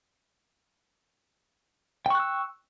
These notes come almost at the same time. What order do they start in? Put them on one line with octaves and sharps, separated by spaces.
G5 C#6 F#6 E6